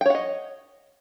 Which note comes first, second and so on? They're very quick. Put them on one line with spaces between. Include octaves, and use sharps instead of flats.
G5 C#5 F#5 D#5